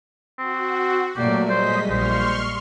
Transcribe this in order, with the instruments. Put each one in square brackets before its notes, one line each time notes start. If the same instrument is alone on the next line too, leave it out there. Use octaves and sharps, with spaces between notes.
[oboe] C4 [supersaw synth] F#4
[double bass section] A#2 F#3 [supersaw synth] A3 [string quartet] A#3 D5 [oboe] G4
[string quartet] G3 [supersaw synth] G#3 D#5 B6 [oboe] C5
[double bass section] A#1 [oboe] C5 [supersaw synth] C6 C#6 F6